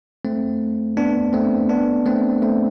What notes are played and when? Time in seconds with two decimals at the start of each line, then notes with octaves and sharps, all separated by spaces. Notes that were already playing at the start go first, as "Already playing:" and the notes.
0.25 A3 C4
0.97 B3 D4
1.33 A3 C4
1.69 B3 D4
2.06 A3 C4
2.42 A3 C4